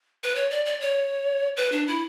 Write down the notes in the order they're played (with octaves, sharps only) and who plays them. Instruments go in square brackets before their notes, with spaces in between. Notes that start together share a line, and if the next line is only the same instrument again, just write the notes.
[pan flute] B4
C#5
D5
D5
C#5
B4
D4
E4